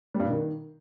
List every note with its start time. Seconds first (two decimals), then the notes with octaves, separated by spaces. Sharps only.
0.14 G3
0.20 G2
0.25 B2
0.30 D#3